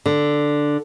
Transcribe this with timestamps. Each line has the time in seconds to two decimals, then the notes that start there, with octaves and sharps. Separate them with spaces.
0.06 D3